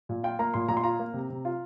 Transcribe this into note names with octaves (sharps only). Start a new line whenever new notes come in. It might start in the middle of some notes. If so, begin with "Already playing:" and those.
A#2
F4 G5
A#3 A#5
A#2 C6
A#2 A#5
C6
F4 A#5
A#3
C3
C3
F4